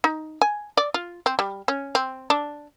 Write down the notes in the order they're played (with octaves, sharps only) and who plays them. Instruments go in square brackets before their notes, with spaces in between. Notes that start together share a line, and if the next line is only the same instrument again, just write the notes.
[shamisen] D#4
G#5
D5
F4
C4
G3
C#4
C4
D4